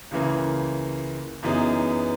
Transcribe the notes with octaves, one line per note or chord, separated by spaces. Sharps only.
C#2 C#3 E3 A#3
F#2 E3 B3 D#4 G#4